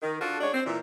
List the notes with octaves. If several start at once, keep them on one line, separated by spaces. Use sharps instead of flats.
D#3
D4 F4 F#4 A4
G#3 D4 D#4 F#4 C#5
C4
A#2 E3